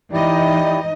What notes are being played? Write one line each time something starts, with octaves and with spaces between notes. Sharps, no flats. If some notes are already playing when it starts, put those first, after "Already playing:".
E3 D#4 E4 G4 D5 D#5